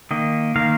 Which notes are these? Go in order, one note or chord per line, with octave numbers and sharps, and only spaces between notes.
D#3 A#3 D#5
D#3 A#3 F5